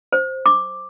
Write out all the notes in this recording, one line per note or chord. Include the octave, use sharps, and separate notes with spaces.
C5
D6